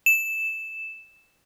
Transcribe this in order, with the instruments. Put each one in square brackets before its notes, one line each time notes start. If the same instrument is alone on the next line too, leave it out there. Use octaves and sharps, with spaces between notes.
[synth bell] E7